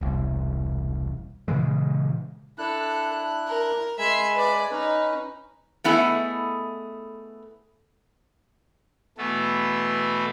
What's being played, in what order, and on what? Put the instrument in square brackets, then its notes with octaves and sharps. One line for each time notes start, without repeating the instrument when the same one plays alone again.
[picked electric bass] E1 C2
A#2 C#3 E3 G#3
[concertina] D4 E4 F#6 [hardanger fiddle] A4
[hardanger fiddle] A#4
[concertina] G#3 G#5 B5 [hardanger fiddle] E5 C6
[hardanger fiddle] B4 D5
[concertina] C#4 B4 [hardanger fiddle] D#4
[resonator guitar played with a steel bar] A3 B3 E4 G#4 A4 D#5
[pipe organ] B2 E3 A3 B3 A4